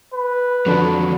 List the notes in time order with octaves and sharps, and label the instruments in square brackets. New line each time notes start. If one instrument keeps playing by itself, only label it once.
[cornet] B4
[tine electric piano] F2 D3 D4 [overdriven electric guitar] F3 F#3